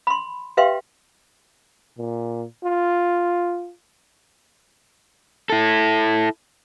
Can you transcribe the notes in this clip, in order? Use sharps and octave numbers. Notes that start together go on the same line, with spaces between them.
B5 C6
G4 B4 E5 F5 G5 C6
A#2
F4
E4 A4